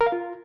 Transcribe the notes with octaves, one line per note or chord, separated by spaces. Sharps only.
A#4
F5
F4